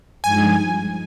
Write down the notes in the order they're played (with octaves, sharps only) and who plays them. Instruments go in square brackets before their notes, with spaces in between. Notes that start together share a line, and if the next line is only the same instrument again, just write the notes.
[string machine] G2 F3 G#3 D#4 [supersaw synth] G#5